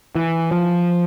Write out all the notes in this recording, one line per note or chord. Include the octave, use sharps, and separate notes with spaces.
E3
F3